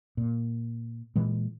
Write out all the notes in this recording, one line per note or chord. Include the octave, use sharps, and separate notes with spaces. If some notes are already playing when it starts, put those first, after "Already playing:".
A#2
A#2 E3 G#3